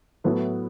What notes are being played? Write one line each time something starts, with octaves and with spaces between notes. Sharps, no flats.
A2 F#3 B3 E4 A4